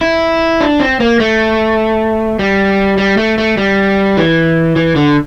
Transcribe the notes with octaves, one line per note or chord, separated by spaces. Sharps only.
E4
D4
C4
A#3
A3
G3
G3
A3
A3
G3
E3
E3
D3